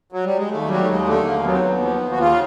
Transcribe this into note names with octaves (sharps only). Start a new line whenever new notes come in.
F#3
G3
G#3
D#2 A3
F#3 G3
A3
D#2 G#3
D3 A3
D#2 A#3
F#3 B3
C4
B3
D#2
F3
D#2
F#4
C#3 F4